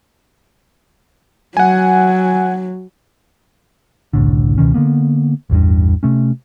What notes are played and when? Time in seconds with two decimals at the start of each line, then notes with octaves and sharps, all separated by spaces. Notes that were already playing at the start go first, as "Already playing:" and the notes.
1.57 F#3 F#5 G#5
4.13 F#1 C2 A2 D3
4.58 C#2 B2 D#3 C#4
4.74 D3 F3 A#3 B3
5.50 A1 E2 G2
6.03 C3 A3 C#4